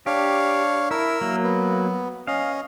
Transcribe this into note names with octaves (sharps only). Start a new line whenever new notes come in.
D4 G4 C#5 F5
E4 A#4 E6
F#3 A#3
B3
C#4 D#5 F5